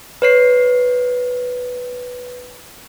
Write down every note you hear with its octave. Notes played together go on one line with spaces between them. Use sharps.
B4 C#5 C7